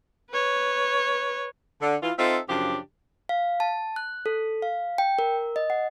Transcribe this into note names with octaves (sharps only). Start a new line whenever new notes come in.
B4 C#5
D3
E3 F4
C4 D#4 F4 A4 E5
F#2 C#3 F3 D4 G4
F5
A5
F#6
A4
F5
G5
A#4
D#5
F#5